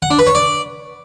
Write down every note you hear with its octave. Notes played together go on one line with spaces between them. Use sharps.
F#5
D4
B4
C#5
D5